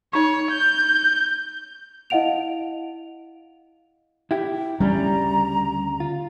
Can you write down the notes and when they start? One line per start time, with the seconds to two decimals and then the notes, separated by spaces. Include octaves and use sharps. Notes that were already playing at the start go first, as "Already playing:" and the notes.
0.13 D#4 C#5 C#6
0.51 G6
2.10 E4 D#5 F5 F#5 D7 F7
4.31 E4 G4
4.80 D2 C#3 G3 C#4 A#5
6.00 F4